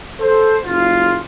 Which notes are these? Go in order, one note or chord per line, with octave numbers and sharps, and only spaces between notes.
A4 C5
F#1 F4